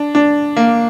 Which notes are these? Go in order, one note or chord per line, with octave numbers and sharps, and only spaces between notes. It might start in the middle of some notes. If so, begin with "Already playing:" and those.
Already playing: D4
D4
A#3